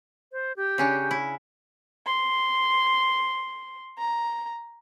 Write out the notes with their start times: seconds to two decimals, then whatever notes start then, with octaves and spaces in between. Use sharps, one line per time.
0.32 C5
0.56 G4
0.78 C#3 C#4 D4
1.11 E4
2.07 C6
3.98 A#5